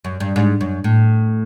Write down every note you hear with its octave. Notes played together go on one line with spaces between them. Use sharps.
F#2
G2
G#2
F#2
A2